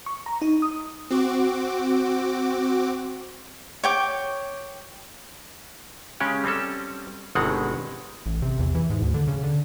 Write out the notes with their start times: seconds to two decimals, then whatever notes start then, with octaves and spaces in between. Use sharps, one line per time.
0.06 C#6
0.26 A#5
0.42 D#4
0.62 D#6
1.10 C4 F#4 D6
3.84 C#5 G5 D6
6.20 C#3 G#3 C#4 G4
6.44 G3 C4 C#4 A4
7.35 G1 B2 D#3 G#3 C4 F#5
8.26 A1
8.42 C3
8.59 E2
8.75 E3
8.90 G#2
9.02 D2
9.14 D3
9.27 C#3
9.43 D3